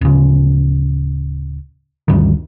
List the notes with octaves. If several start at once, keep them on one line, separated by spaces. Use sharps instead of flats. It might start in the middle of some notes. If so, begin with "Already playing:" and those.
D1 C#3
D2 G2 D#3